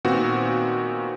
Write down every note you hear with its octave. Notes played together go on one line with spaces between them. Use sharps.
A#2 D#3 B3 C4 F#4